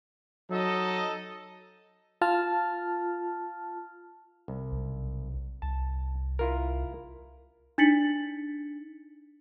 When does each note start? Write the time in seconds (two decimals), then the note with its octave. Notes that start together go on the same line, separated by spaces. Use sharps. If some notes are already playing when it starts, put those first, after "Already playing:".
0.50 F#3 D#4 A4 D#5
2.22 F4 A5 F6
4.48 C2
4.72 B1
5.62 C2 A5
6.39 E4 F4 A#4
7.78 D4 D#4 A6 B6 C#7 F#7